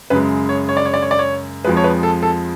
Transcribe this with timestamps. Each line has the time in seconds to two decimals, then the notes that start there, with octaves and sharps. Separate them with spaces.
0.10 F#2 C#3 G#3 B4
0.49 C#5
0.69 C#5
0.77 D5
0.85 C#5
0.94 D5
1.02 C#5
1.11 D5
1.19 C#5
1.65 F2 F3 G#3 B4
1.77 C#5
1.84 B4
2.03 A4
2.22 A4